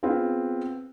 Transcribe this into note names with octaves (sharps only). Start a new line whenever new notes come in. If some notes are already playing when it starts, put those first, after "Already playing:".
B3 C4 F4 G#4 B4